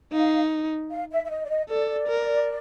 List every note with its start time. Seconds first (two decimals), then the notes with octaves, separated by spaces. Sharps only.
0.12 D#4 F5
0.90 F5
1.11 E5
1.24 E5
1.29 D#5
1.45 D5
1.49 D#5
1.68 A4 D5
2.08 A#4